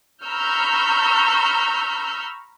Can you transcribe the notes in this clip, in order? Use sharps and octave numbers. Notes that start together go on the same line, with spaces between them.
A#5 B5 C#6 E6 F6 G6